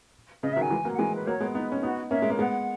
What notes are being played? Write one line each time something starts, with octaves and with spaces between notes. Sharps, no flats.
C#3 D#5
E5
D#3 F#3
G#5
E3 G#3
F#3 A#3
F#5
E3 G#3 G#5
B4
F#3 A#3 C#5
G#3 B3
B3 D#4 B4
C#4
B3 D#4 F#4
A#3 C#4 E5
G#3
A#3
G#3 B3 F#5